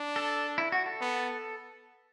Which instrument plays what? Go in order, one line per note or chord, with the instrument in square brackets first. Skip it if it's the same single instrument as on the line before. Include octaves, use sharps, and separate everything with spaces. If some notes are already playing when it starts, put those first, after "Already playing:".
Already playing: [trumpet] D4
[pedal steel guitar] A4
E4
F#4
A4
[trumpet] B3